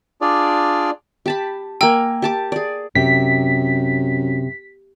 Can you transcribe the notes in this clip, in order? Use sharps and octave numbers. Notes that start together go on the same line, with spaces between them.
D4 F4 G#4 D5
G4 A5 B5
A#3 G5 G#5 A#5 E6
G4 A5 D6
G#4 D5
F#2 C3 B6